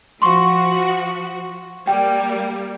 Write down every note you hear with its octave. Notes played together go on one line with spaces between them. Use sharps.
F3 F#4 C6 C#6
G3 A#3 G5